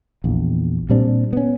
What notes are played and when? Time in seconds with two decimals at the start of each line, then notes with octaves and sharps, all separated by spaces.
0.24 A#1 E2
0.89 A#2 G3 C4 D4
1.33 B3 C#4